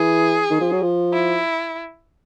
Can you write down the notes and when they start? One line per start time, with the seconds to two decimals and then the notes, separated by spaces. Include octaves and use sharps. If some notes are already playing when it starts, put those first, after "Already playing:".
Already playing: E3 G#4
0.50 D#3
0.60 F3
0.72 F#3
0.82 F3
1.13 E4